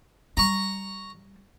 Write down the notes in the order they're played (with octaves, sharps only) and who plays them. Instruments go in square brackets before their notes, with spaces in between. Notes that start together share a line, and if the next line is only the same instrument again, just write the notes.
[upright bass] G3 [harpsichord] A#5 C#6